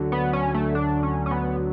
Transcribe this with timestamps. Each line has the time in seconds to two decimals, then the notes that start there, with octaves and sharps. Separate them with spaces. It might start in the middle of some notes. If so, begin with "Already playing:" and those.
Already playing: D2 D3 F#3
0.12 B3
0.33 C#4
0.54 A3
0.75 D4
1.03 C#4
1.26 C#4
1.31 B3